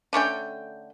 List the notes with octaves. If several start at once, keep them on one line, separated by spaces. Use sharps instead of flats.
D3 A3 C#4 G5